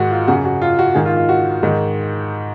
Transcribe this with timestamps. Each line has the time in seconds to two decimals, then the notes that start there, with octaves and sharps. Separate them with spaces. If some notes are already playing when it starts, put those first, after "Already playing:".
Already playing: G#2 D#3 F#4
0.11 F4
0.27 F#2 C#3 F#4
0.45 F#4
0.62 F4
0.79 F#4
0.95 G#2 D#3 G#4
1.06 F4
1.17 F4
1.29 F#4
1.63 G#2 D#3